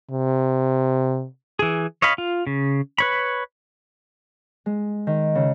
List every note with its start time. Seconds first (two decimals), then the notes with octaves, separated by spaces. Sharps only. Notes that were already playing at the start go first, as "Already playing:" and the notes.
0.11 C3
1.59 E3 G#4
2.02 C#5 D#5 F5 B5
2.18 F4
2.47 C#3
2.98 B4 C#5 B5
4.66 G#3
5.07 D#3
5.35 C#3